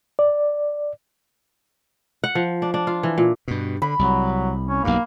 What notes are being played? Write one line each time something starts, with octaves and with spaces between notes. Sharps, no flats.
D5
F#5
F3
D4
D4
F4
E3
A#2
G2 B2
D3 B5
C2 F#3
C#4
B1 G2 A#3